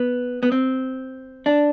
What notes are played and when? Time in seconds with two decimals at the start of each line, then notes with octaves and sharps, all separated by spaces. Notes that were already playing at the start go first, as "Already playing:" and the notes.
Already playing: B3
0.43 B3
0.52 C4
1.46 D4